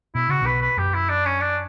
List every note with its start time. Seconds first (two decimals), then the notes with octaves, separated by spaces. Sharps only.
0.15 B2 E4
0.29 C#3 F#4
0.42 B1 B2 B4
0.61 B4
0.77 F#2 G4
0.94 E4
1.09 D4
1.25 C#4
1.40 D4